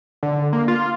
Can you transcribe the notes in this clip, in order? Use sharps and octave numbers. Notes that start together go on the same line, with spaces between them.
D3
A#3
F4